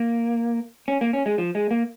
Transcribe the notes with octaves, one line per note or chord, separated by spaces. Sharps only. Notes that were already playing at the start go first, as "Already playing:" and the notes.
Already playing: A#3
C#4
A#3
C#4
G#3
F3
G#3
A#3